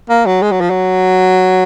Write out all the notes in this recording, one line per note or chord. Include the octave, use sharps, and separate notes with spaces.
A#3
F#3
G#3
F#3
F3
F#3